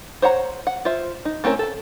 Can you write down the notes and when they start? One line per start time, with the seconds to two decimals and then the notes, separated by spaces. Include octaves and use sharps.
0.22 C5 C#5 F#5 A#5
0.67 F#5
0.85 F4 C5 E5
1.25 D#4
1.44 A3 C4 C#4 E4 A#4
1.59 A4 A5